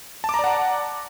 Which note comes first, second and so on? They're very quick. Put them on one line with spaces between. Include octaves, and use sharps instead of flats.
A5 D6 A#5 D5 F#5